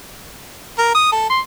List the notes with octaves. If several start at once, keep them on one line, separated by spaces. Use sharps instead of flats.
A#4
D#6
A4
C6